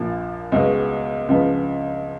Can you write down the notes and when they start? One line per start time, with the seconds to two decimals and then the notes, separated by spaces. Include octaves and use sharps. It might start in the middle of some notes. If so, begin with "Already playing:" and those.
Already playing: A#1 A#2 F3
0.52 C#2 B2 G#3 B3
1.29 C#2 C#3 F3 B3